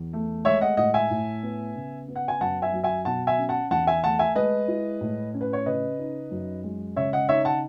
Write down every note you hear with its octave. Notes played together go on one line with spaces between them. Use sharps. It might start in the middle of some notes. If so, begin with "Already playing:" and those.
Already playing: E2
A3
G#3 C#5 E5
D#5 F#5
A2 D#5 F#5
E5 G#5
A2
B3
C#3
B3
F#5
G#5
F#2 F#5 A5
E5 G#5
F#3
E5 G#5
B2 F#5 A5
E5 G#5
C#4
F#5 A5
E2 F#5 A5
E5 G#5
A3 F#5 A5
E5 G#5
G#3 B4 D#5
E4
A2
C#4
B4
C#5
C#3 B4 D#5
D#4
F#2
G#3
C#3 C#5 E5
D#5 F#5
D#4 C#5 E5
F#5 A5